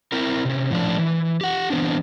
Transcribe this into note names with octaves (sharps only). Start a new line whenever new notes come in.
C4 E4 A#4
C3 C#4
A2 F3 D4
E3
G4 F#5
E3 B3 C4 D4